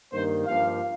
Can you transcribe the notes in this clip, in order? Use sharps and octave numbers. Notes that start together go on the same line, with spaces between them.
G2 D#3 A#3 C5
G2 F3 A#3 F5